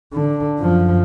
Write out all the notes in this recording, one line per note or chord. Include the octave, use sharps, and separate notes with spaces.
D3
F#2 F3